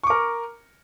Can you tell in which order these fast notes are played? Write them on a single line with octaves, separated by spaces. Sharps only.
C#6 D6 A#4